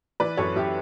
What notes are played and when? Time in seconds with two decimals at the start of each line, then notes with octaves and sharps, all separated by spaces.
0.20 E3 B4 D5
0.37 F#2 A4 C#5
0.56 F#2 E4 G4